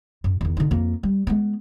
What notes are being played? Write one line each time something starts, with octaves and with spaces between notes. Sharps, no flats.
F#2
E2 D#3
D3 D#4
F2 A#3
G3
G#3 B3